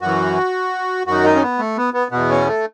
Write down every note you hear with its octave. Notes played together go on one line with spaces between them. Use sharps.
F#2 E3 F#4
F#2 D#3 F#4
D#4
C#4
B3
A3
B3
B3
E2 B2 B3
C#4
A3